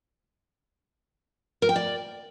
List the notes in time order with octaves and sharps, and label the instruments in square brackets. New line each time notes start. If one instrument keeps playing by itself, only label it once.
[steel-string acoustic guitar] A#4
G5
D5